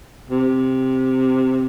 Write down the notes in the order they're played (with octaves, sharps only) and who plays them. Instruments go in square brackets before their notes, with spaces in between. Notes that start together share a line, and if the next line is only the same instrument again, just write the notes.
[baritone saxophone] C3